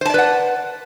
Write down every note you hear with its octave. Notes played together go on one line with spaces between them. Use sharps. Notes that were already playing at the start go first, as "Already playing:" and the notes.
B4 C5 D5 F#5 A5